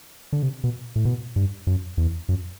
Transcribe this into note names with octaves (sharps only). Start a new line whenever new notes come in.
D3
C3
B2
A2
B2
G2
F#2
E2
F#2